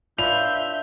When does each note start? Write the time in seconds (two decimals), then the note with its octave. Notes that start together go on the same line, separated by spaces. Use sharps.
0.18 D4 F4 B4 C#5 E5 B5 G6 F7